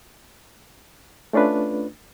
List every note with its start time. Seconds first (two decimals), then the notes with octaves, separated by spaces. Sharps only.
1.33 A3 C#4 D4 F4 B4